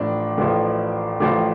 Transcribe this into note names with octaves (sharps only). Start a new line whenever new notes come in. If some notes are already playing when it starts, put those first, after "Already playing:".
Already playing: A1 A2 F3 D4
A1 A2 F3
A1 A2 F3